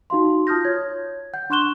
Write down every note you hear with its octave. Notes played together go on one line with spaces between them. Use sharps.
D#4 F#4 F5 C6
F4 A5 D#6 F6 G6 A#6
C#5 G#6
F#5 G6
D4 C6 C#6 F#6 E7 G7